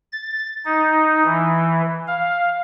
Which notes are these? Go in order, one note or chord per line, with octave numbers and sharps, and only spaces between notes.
A6
D#4
E3
F5